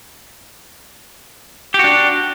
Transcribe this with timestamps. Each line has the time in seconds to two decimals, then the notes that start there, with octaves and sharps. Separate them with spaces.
1.74 G4
1.79 F#4
1.84 D4